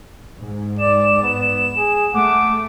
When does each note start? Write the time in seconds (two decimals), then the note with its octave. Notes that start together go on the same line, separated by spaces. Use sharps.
0.40 G#2
0.79 D5 E7
1.23 B3
1.77 G#4
2.14 A3 F#5 D6